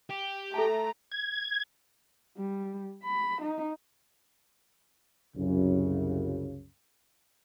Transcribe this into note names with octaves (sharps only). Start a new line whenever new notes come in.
G4
A3 A4 A5 A#5
G#6
G3
B5
D#4
C2 F#2 C#3